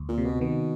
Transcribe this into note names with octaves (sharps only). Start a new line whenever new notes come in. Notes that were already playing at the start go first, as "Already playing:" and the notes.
Already playing: D2
A#2
C3
B2
B2 D#3